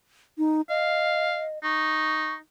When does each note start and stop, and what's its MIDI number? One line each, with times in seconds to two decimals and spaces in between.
0.38 0.61 63
0.69 1.59 75
0.69 1.44 77
1.64 2.37 63
1.64 2.34 85